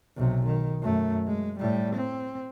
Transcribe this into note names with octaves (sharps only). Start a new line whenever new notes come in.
B1 C3
D#3
F#2 A3
G#3
A2 G3
C4